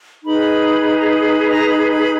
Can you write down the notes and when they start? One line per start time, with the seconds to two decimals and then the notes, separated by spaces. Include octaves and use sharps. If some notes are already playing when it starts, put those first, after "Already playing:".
0.22 D#4 G#4 B4 B5
0.85 B5
0.95 A#5
1.06 B5
1.48 A#5
1.68 B5
1.89 B5